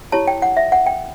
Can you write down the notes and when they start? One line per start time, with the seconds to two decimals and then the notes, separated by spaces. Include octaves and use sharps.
0.12 E4 G4 C#5 A5
0.28 G5
0.42 F#5
0.57 E5
0.72 F#5
0.86 G5